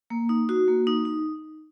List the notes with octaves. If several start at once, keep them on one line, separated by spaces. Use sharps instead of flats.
A#3
D#4
F#4
A#3
D#4
D#4